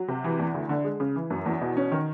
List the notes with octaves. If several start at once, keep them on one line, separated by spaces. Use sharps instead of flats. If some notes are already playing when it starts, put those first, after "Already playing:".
Already playing: F#3
C3
E3
E2
D2
D3
G#3
C#3
E3
F#2
E2
B2
C#4
D#3